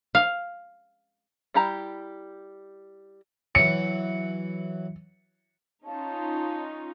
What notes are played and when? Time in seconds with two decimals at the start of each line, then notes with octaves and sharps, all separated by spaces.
0.15 F5
1.54 G3 E4 G4 A#5
3.55 E3 F#3 C#7
5.86 C#4 D#4 F4 C#5 F5 A5